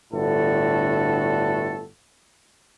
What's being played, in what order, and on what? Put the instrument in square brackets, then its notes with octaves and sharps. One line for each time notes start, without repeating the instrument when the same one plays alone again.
[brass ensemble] G1 A2 D3 F#4 A4